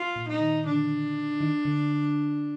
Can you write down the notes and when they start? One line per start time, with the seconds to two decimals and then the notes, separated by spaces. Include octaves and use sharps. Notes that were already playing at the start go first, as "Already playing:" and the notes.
Already playing: F4
0.16 A#2
0.28 D#4
0.41 D#3
0.66 D3 D4
1.41 D#3
1.65 D3